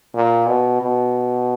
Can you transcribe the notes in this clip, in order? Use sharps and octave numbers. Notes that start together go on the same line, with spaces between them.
A#2
B2
B2